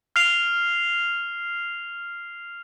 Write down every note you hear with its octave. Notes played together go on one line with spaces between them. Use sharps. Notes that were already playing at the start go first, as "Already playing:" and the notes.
F6 C7 F7